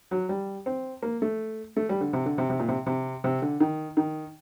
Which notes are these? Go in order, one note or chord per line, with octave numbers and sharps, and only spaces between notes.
F#3
G3
C4
A#3
A3
A3
G3
D3
C3
D3
C3
C3
A#2
C3
C3
C3
D3
D#3
D#3